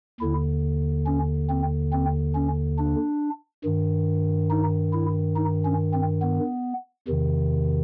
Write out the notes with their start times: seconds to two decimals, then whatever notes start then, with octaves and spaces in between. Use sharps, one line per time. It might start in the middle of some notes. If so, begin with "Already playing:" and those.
0.20 D#2 D3 E4
1.06 C#4
1.50 C4
1.92 C4
2.35 C#4
2.78 D4
3.64 G2 D#3
4.50 D#4
4.93 E4
5.36 D#4
5.65 C#4
5.93 C4
6.22 B3
7.08 E2 C3 D#3